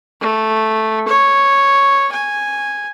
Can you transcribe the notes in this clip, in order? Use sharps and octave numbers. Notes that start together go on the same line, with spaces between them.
A3
C#5
G#5